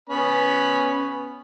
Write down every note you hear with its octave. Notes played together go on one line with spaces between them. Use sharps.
B3 C#4 B5